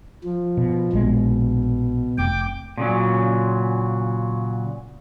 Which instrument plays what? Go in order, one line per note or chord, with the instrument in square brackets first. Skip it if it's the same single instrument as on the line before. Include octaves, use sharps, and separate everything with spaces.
[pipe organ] F3
[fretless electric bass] B2
[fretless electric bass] A#1 G#3 [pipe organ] B2
[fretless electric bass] F1 [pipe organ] G5 D6
[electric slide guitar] A#2 C#3 F#3